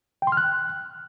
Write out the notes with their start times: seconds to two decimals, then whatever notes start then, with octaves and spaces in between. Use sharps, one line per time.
0.22 G5
0.27 C6
0.32 F6
0.37 F#6